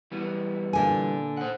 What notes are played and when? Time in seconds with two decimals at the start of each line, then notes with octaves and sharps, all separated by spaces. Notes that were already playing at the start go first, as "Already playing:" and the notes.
0.12 E3 G3 B3
0.73 A#2 D3 G#5
1.37 C5 F#5